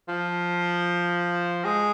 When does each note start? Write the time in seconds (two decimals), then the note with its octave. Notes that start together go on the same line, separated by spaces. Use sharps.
0.08 F3
1.65 G#3